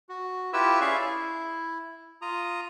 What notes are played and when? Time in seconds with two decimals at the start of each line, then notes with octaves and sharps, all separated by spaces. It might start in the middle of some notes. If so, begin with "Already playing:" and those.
0.09 F#4
0.53 E4 F4 G4 B4 E6
0.81 C#4 G#4 D5 E5 F5 C#6
1.00 E4
2.22 F4 A#5 D#6